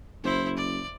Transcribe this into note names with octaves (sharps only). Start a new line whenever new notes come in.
F#1 E4 C5
D5